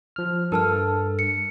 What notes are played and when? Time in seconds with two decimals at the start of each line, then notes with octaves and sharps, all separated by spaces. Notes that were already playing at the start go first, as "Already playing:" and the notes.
0.16 F3 F6
0.52 G2 A4 A#4 A5 F6
1.19 C#7